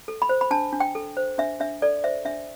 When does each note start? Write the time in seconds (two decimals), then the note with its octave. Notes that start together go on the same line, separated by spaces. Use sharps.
0.08 A4
0.22 B5
0.29 C5
0.41 B5
0.51 D4 A5
0.73 D4
0.80 G5
0.95 A4
1.17 C5
1.38 D4 E5
1.60 D4 E5
1.82 A4 D5
2.04 C5 E5
2.25 D4 E5